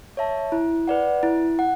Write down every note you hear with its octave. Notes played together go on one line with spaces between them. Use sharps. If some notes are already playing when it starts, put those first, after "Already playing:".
C#5 E5 A5
E4
B4 D5 F#5
E4
F#5